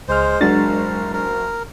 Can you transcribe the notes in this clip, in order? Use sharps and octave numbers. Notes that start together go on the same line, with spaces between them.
C#2 G#3 C5 F6
F#1 F#3 G#3 D4 F#4 A#4 A6
A#4